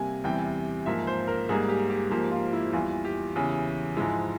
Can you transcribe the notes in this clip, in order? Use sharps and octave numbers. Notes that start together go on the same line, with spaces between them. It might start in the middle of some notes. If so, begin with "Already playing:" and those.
Already playing: C3 G3 A#3 G#5
E2 C3 E3 G3 G5
G#2 F3 A#3 E5
C5
A#4
G#2 G3 A#3 G#4
G4
G4
G#2 F3 A#3 G4
F4
E4
E2 E3 G3 F4
G4
E2 C#3 E3
G#2 F3 G#3 E4